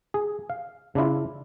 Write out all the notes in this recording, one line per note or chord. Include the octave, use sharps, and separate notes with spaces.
G#4
F5
C#3 D4 E4 F4